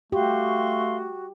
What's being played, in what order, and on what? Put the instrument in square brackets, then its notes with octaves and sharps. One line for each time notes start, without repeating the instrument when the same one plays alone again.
[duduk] A3 [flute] F#4 [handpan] G4 [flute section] F5 C6 C#6